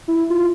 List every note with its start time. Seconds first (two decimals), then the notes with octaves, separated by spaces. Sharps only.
0.08 E4
0.30 F4